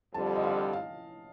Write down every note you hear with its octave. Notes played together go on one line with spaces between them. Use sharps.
F2 D3 G3 A5
D#5
F5
F5